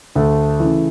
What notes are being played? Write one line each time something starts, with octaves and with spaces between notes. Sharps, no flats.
D2 A3 A4
C#3 E3